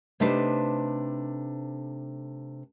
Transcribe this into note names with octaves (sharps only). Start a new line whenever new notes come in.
C3 A3 D4 D#4 B4 C5